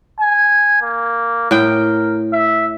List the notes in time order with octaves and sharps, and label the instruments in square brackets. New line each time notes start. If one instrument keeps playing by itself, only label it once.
[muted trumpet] G#5
A#3
[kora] A2 G5 [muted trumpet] A#4
[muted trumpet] E5